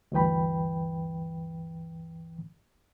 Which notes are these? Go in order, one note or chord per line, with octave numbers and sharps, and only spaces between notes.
D2 G2 E3 B4 G5 B5